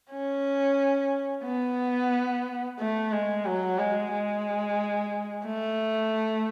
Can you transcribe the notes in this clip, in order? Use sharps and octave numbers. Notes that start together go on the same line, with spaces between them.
C#4
B3
A3
G#3
F#3
G#3
G#3
A3